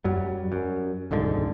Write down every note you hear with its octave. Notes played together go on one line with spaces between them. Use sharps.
F#2 F#3 G3
F#2
D#1 C2 G#2 D3